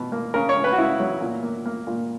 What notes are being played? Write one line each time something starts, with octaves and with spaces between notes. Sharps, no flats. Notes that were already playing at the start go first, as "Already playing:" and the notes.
Already playing: B2
A#3
C#3 A#4
C#5
C#3
B4
F#4
C#3 E4
F#3
A#2
A#3
A#3
A#2